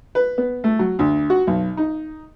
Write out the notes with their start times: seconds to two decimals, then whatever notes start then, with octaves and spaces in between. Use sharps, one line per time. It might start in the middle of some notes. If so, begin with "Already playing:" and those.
0.15 B4
0.38 B3
0.64 A3
0.79 F#3
0.99 D2
1.30 F#4
1.47 B1
1.77 D#4